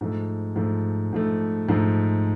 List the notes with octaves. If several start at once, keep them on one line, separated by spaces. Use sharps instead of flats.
G#2 F3 A3
G#2 F3 A3
G#2 F3 A3
G#2 F3 A3